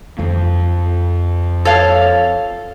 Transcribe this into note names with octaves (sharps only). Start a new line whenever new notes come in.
F2 F3
A4 C#5 F5